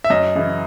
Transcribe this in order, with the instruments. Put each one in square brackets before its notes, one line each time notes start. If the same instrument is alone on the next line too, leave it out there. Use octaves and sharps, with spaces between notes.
[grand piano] E5
F#2 D#5
C#3 E3